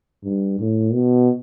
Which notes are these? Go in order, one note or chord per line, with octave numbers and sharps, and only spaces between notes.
G2
A2
B2